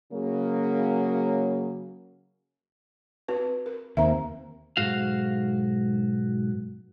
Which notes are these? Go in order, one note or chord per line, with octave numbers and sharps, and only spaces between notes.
C#3 F#3 A#3
C4 F#4 B4
A#4
D#2 A#3 C4 E5 A#5
B1 G#2 F#4 F5